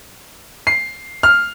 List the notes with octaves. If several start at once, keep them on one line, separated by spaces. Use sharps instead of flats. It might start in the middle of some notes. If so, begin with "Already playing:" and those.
C7
F6